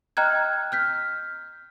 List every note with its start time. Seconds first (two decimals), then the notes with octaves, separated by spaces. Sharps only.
0.17 D#5 G5 A#5 F6 F#6 G#6
0.72 F6 G6 B6